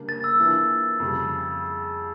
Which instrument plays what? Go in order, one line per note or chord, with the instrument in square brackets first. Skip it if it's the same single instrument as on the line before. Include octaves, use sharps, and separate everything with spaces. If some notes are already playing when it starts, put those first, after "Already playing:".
Already playing: [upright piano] C#3 G3 A#3 D4
[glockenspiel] A6
E6
[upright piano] E3 A#3 D4 F4
F2 C#3 G3